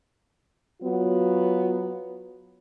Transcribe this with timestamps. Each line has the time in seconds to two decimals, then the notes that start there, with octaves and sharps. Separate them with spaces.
0.82 F#3 B3 F4 F#4